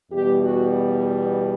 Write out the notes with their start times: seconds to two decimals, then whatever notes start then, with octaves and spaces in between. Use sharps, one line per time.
0.12 E2 B2 G3 G4
0.44 F#4